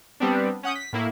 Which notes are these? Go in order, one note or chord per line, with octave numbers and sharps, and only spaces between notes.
G3 B3 C4 D4
C#4 F#5 D#6 G6
B6
A2 A#3 E4